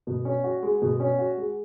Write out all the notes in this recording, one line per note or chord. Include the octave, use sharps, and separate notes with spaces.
B2
C#4
F#4
G#3
B2
C#4
F#4
G#3